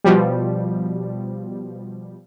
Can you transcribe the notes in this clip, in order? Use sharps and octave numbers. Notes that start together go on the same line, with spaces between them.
B2 F3 G3